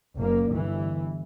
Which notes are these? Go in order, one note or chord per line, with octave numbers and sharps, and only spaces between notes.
F#1 A#3
G1 E3